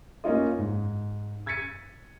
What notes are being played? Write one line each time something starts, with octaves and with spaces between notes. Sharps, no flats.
A#3 C#4 D#4 F4 D#5
G#2
E6 G#6 A6 B6 C#7 D#7